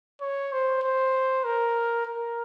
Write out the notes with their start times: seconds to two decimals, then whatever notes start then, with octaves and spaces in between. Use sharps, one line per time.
0.21 C#5
0.52 C5
0.83 C5
1.44 A#4
2.05 A#4